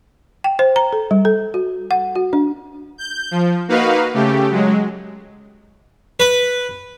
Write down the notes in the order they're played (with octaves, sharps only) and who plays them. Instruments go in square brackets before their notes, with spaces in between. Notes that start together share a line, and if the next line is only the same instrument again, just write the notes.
[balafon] G5
C5
A#5
A4
G3
A4
F#4
F#5
F#4
D4
[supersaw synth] G6
F3
A#3 D#4 F#4 B4 F5
C#3 A3 G4
F#3 G#3
[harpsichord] B4